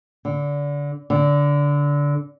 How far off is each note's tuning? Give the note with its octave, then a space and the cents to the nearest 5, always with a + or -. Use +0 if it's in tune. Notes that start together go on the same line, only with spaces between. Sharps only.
D3 -25
D3 -20